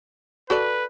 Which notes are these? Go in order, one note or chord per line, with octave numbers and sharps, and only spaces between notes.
F#4 A4 B4 D5